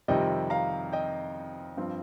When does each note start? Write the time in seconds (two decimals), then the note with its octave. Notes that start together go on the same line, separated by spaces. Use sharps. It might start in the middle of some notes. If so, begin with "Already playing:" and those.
0.08 F2 C3 D#3 G3 C4 D#5 G5
0.50 F5 A#5
0.93 D#5 G5
1.77 G2 F3 C4